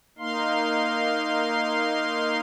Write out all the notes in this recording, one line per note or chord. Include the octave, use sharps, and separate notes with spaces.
A#3 D#4 F5 C6